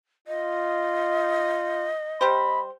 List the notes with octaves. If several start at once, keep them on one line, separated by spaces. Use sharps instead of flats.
F4 D#5
G3 G4 C5 B5